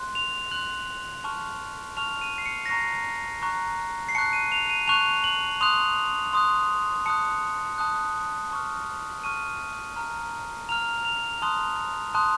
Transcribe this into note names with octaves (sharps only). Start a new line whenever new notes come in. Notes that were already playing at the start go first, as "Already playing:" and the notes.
Already playing: C6 F#6
F7
C6 F#6 F#7
A5 C#6 F6
A5 C#6 F6 F7
D#7
C7
C#7
A#6
A#5 C#6 F#6 C7
A#5 C#6 F#6
C7
A5 C#6 F#6 C#7
D#7
F7
D#7
A5 C#6 F#6 F7
F#7
C6 D#6 F#6 F7
C6 D#6 F#6
A5 D#6 F#6 C#7
A5 D#6 F#6
A5 C#6 F6
A5 C#6 F6 D#7
A#5 F6
A#5 F6 F7
F7
A5 C6 D#6 F#6
A5 C6 D#6 F#6